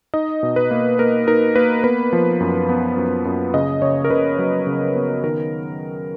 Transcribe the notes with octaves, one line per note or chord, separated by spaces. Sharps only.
D#4 D#5
B2
B4
A#3
A#3 A#4
D#4 A#4
A#3 B4
B3 B4
F3
F#2
B3
F#2
F#2
C#3 D#5
C#3 C#5
A#4
C#3 B4
F#3
C#3
B3
D#3 A#4